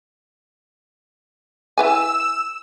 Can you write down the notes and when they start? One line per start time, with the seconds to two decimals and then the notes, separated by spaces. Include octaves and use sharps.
1.78 E4 B4 G#5 E6